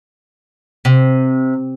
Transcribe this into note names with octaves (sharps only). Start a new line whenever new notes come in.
C3